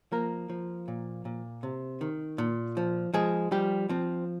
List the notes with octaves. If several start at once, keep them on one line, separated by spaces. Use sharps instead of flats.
F3 A#3 A#4
F3
A#2
A#2
C3
D#3
A#2
F3
F3 G#3 G#4
F3 G3 G4
F3 C4